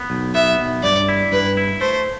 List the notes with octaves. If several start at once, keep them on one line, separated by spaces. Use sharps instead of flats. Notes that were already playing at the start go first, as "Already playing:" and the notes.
Already playing: B3
B1
B3 E5
B1
G2 D5
E4
G2 B4
E4
A3 C5